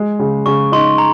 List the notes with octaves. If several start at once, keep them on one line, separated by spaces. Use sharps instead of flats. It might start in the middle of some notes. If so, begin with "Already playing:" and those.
Already playing: G#3
C#3
C#3 C#6
D#4 C6
A#5